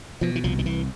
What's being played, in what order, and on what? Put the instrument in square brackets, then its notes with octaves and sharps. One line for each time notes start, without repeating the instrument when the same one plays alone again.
[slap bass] B2 F3
E3
C2 F3
D#3
C2 E3